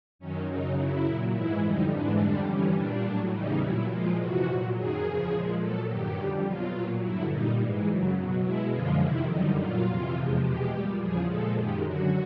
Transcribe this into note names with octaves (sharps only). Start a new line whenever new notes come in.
F#2 D#3 F#3 C#4
F#2 C#3 F#3 D#4
F#2 C#3 F#3 E4
A#2 F#3
G#2 E3 G#3 E4
F2 D3 G3 D#4
G#2 E3 G#3 D4
F2 D3 G3 D4
G2 E3 G3 C#4
A#2 G3 D4
A2 F#3
E2 C#3 E3 G3 D#4
A#2 F#3 E4
A#2 F3 G#3 F4
F2 C3 E3 F#4
A#2 F#3
F#2 D#3 F#3 G#4
E2 C#3 F3
A#2 F3 G#3
A#2 F#3 A4
G2 D#3 F#3 G4
F2 D3 G3
B2 F#3 F4
A#2 F#3
G2 D3 F#3 E4
A#2 G3 D#4
G#2 E3 G#3
F#2 C#3 F#3
B2 F#3
B2 G#3 E4
F#2 D3 F3 G#3 F4
F2 C3 D#3 E4
F#2 D3 G3 D#4
A#2 F#3 F4
F2 C3 E3
E2 C3 F3 G#3
E2 B2 G#3 G4
A#2 G3
E2 C#3 F3 G#4
A#2 F3 G#3 A4
F#2 D#3 G#3 G4
F#2 D3 F#3 F#4